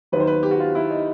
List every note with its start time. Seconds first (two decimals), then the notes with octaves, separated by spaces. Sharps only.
0.12 D#2 D#3 F#3 B4
0.20 C5
0.27 B4
0.43 G4
0.51 F#4
0.60 F4
0.75 E4
0.91 D#4